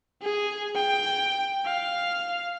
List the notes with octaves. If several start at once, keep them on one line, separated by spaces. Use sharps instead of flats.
G#4
G5
F5